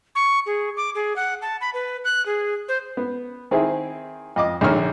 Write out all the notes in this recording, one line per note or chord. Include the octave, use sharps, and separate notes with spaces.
C#6
G#4
D6
G#4
F#5
A5
B5
B4
F#6
G#4
C5
B3
D#3 C4 E4 G#4
F2 D#5 D6
A#1 D3 D#3 C#5 F6